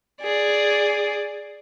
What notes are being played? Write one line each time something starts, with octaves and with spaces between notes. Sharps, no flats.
G#4 D5